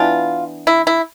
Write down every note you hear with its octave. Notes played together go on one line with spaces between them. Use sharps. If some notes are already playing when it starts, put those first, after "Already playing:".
Already playing: E3 B3 D4 F4
E4
E4